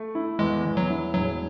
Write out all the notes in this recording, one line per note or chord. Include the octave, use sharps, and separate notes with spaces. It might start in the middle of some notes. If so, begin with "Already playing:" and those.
Already playing: A3
E4
E2 G#3
E2
F#3
E4
E1 F#3